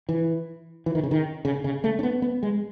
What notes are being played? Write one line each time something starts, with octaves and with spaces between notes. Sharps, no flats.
E3
E3
D#3
C#3
D#3
C#3
C#3
A3
C#4
B3
B3
G#3